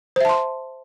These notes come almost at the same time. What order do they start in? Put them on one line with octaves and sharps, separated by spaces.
C5 E5 A5 C6